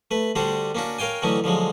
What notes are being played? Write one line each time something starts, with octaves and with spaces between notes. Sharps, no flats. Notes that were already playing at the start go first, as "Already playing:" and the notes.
A3 B4
D3 G3 D4 F#4 C5
A#3 C#4 D4 F#4
A#4 C#5 F5 G5 G#5
D3 E3 F#3 A3 C#4 D#4
D3 F3 F#3 G#3